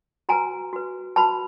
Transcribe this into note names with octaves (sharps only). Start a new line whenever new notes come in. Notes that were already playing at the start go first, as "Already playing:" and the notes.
F#4 B4 G#5 A#5
F#4 B4
F#4 B4 A5 B5